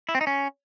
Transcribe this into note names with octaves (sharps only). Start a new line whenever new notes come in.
E4
C4
D#4
C#4